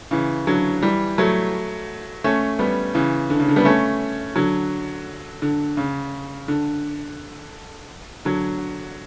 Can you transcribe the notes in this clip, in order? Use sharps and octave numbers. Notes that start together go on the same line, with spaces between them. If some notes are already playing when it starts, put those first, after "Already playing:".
C#3 E3
D3 F#3
E3 G3
F#3 A3
A3 C#4
G3 B3
C#3 E3
D3
C#3
D3
G3 B3
A3 C#4
D3 F#3
D3
C#3
D3
D3 F#3